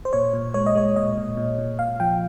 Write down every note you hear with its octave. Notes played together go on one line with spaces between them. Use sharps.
C5
A#2 C#5
A#2
G#3 C#5
D#5
G#3 C#5
A#2 D#5
A#2
A#2
A#2
A#2 F5
F3 G5